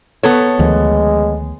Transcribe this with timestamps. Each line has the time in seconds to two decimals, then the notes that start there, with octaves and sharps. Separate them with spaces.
0.23 B3 A4 C#5
0.59 D2 D#3 F3 G#3